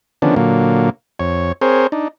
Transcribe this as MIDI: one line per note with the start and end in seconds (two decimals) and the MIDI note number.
0.22 0.35 50
0.22 0.35 51
0.22 0.35 53
0.22 0.35 59
0.22 0.35 61
0.22 0.35 62
0.36 0.90 46
0.36 0.90 50
0.36 0.90 54
0.36 0.90 58
1.19 1.52 41
1.19 1.52 73
1.61 1.87 60
1.61 1.87 68
1.61 1.87 70
1.61 1.87 72
1.61 1.87 73
1.92 2.08 62
1.92 2.08 63